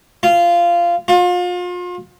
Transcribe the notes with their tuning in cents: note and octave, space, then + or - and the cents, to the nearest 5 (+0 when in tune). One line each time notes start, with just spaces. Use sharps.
F4 -15
F4 +35